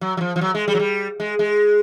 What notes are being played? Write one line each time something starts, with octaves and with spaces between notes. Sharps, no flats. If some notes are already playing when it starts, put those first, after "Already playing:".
F#3
F#3
F3
F3
F#3
G#3
G3
F#3
G3
G#3
G#3